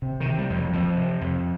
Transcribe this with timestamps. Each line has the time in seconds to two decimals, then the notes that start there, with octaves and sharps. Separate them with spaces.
0.02 C3
0.20 D#3
0.26 C3
0.38 G3
0.50 F2
0.56 F#3
0.73 F2 F3
0.97 C3
1.21 F2